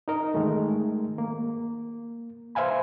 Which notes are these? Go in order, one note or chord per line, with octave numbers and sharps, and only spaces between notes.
D#4 A#4 D#5
D#3 G#3 A3
A#3
B4 C5 E5 F5 G#5 B5